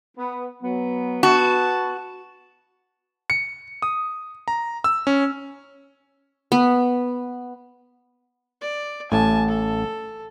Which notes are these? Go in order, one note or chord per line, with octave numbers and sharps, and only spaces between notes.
B3
F#3 B3
B3 F#4 A5
C#7
D#6
A#5
E6
C#4
B3
D5
A1 A2 G#5 A5
A4